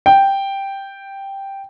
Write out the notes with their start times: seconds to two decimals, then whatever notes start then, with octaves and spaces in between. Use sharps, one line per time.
0.06 G5